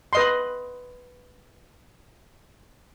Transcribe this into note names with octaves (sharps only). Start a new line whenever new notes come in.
B4 D#5 C6